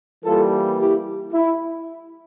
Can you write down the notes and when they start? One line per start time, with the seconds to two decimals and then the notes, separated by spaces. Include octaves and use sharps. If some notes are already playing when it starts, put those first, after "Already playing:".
0.24 E3 G3 A#3 F4 A4
0.79 E4 G4
1.33 E4